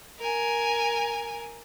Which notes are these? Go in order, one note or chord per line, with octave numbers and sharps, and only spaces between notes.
A#4 G#5